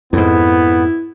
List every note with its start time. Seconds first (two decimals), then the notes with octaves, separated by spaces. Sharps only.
0.13 F2 G#2 B3 E4